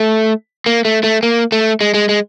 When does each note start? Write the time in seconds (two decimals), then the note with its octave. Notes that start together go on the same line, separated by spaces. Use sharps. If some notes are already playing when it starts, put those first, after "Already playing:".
Already playing: A3
0.66 A#3
0.85 A3
1.04 A3
1.23 A#3
1.52 A3
1.81 G#3
1.94 G#3
2.09 G#3